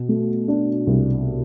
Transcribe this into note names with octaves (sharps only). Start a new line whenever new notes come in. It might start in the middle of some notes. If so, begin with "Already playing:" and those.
Already playing: B2
A3
D4
C2